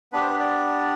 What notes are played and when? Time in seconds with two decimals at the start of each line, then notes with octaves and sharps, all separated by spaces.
0.13 B3 D4 G4 B4
0.21 C5
0.30 B4
0.40 D5